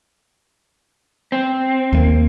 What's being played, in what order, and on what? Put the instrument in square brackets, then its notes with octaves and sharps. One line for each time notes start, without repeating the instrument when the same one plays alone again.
[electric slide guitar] C4
[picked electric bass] D#2 A3 A#3